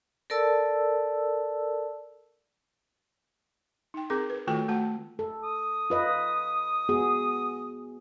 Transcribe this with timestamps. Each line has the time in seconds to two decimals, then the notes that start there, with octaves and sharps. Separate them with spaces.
0.30 A4 A#4 D5 A5 E6
3.94 D#4 G5
4.10 C4 G#4 A#4 D6
4.30 B4
4.47 D#3 A3 F4 F#4 A4 G5
4.69 A3 F#4 F#5 A5
5.19 A4
5.43 D#6
5.90 F4 B4 D#5
6.89 B3 F#4 G#4